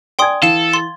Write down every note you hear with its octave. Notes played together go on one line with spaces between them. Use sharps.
D5 G5 G#5 C6 D#6 G#6
E3 A4 F5 E7
C6